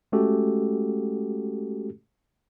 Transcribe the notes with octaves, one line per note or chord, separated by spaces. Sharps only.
G#3 A3 C#4 F#4 G4 A4